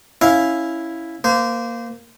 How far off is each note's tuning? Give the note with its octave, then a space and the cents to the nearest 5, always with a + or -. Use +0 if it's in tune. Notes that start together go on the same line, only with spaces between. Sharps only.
C#4 +0 E4 +0 F5 +5
A#3 +0 C5 -25